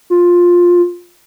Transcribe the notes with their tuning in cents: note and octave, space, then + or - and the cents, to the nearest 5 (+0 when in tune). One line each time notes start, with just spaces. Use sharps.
F4 +10